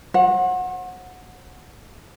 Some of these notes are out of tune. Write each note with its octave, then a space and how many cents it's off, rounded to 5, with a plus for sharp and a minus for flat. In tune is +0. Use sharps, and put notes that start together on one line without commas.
C5 +45 F#5 -15